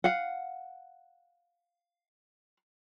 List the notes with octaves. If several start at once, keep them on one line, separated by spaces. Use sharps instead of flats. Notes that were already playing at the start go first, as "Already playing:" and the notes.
F5 F#5